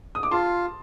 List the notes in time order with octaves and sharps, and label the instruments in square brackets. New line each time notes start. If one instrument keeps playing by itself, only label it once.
[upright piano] D#6
D6
[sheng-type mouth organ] F4 [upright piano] A5 C6